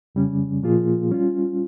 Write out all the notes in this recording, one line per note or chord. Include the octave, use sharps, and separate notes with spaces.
F2 C#3 G3 C#4
A#2 F3 A#3 F4 G#4
G3 C#4 F4